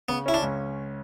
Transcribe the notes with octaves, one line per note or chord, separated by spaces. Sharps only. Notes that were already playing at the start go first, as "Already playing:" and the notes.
C#3 B3
C#4 E4
D4
C#2